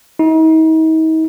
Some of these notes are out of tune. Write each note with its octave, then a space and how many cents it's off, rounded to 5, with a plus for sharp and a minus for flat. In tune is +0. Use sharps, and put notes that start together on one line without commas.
D#4 +40